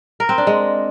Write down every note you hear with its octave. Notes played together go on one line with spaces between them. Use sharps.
A#4
C4
D4
G#3